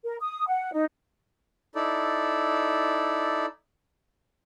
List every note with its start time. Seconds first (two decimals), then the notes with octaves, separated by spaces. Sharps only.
0.04 A#4
0.20 D#6
0.47 F#5
0.72 D#4
1.75 D#4 E4 A4 D5